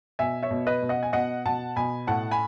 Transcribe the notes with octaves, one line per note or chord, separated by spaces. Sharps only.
B2 E5 G#5
C#5 E5
B2
B4 D#5
B2
D#5 F#5
G#5
B2 D#5 F#5
B2 F#5 A5
B2 G#5 B5
A2 F#5 A5
G#5 B5